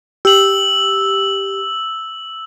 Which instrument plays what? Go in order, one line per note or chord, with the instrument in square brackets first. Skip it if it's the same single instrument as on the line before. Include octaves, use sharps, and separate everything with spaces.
[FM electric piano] G4 [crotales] E6 F#7